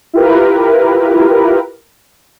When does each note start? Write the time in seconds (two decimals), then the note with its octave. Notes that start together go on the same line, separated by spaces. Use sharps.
0.14 E4 F4 G4 A#4 B4